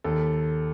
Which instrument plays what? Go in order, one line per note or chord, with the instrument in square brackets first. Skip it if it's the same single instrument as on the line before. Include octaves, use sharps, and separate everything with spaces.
[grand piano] D#2 A4